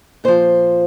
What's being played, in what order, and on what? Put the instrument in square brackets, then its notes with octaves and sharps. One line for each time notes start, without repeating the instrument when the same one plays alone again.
[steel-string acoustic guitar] A#2 F3 C5